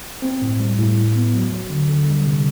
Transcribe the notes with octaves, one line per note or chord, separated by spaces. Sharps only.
C4
A2
G3
A2
A2
B3
F#3
F#3
D3
D3
G3
C3